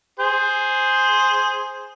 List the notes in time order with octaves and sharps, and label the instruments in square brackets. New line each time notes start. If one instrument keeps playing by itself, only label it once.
[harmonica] G#4 C5